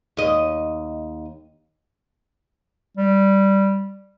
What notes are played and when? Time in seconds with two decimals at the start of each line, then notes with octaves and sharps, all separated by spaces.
0.17 D#2 D#5
2.97 G3